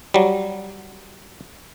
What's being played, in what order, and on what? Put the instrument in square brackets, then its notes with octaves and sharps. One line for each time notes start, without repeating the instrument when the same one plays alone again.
[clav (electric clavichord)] F#3 G3